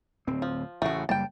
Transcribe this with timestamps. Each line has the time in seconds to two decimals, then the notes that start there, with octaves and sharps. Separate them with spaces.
0.27 D1 C4
0.42 F3
0.82 A1 C#3 A3 F#4
1.09 F#1 G3 A#3 G5 A5